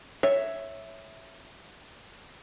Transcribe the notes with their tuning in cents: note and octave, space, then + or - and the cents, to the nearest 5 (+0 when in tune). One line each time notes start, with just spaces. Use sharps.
C#5 +0 E5 +0